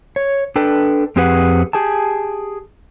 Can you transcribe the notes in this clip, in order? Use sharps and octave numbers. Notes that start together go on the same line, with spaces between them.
C#5
D4 A4 B4 G5
F2 C4 G4 G#4 B4 F#5
G4 G#4 G#5 A5